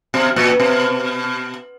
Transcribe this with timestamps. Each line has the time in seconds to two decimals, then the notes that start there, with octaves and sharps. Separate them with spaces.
0.14 B2
0.36 A#2
0.60 B2